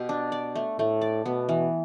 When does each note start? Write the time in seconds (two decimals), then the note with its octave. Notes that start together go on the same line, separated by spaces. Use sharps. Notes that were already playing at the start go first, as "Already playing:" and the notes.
Already playing: B2 G4
0.09 D4
0.32 D5
0.55 A3
0.79 A2 A3
1.01 D5
1.26 B2 B3
1.49 E3